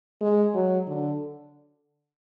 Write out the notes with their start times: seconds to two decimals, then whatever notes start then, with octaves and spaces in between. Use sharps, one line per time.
0.21 G#3
0.55 F#3
0.87 D3